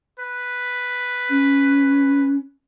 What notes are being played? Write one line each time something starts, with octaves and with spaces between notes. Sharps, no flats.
B4
C#4